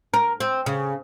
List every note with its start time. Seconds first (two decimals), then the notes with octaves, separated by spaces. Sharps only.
0.14 A#4
0.40 C4
0.66 C#3